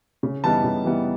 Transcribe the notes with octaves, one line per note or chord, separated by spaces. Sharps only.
C#3
E3 G3 B3 D#4 A5
C#3
E3 G3 B3 D#4